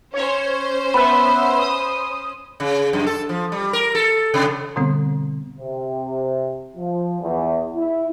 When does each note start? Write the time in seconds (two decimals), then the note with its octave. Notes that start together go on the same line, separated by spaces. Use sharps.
0.14 C#4 C5 C#5
0.94 B3 B4 E5 B5
1.59 D#6
2.60 C#3
2.93 F#2
3.06 A4
3.29 F3
3.52 G3
3.73 A#4
3.95 A4
4.34 C3
4.76 B2 D3 G3 B3 C4
5.58 C3
6.76 F3
7.22 E2
7.76 E4